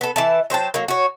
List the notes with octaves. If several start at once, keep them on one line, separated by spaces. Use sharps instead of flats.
B3 A4
E3 E4 A5
F#3 C5 G5 A5
F#3 A#3
F#4 C#5